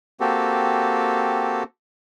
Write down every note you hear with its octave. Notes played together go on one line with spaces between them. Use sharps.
A#3 C4 F#4 G4 A4